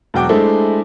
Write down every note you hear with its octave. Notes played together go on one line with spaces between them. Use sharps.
E1 F#3 F#4 G5 D6
G#3 A3 D4 E4 A4 C5